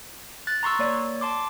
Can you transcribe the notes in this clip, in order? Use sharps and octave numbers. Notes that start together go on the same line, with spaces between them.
F#6 A6
A#5 C6 C#6 E6
A#3 C#5 D5
A5 C6 D6